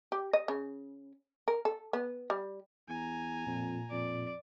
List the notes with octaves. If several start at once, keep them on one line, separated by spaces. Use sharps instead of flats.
G4
D#5
C#3
A#4
A4
B3
G3
E2 G#5 A#5
F2 A#2
F2 D5